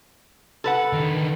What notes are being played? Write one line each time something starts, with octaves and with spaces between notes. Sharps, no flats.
A4 B4 F#5
D3 D#3